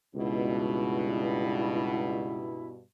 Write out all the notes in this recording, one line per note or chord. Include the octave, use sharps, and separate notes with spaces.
C#2 G2 B2 E4